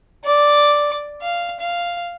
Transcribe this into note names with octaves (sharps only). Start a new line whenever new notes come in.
D5 D6
F5
F5